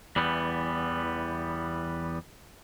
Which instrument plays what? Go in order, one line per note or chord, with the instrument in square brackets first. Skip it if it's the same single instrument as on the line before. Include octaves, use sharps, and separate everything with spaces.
[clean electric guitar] E2 E3 G3 B3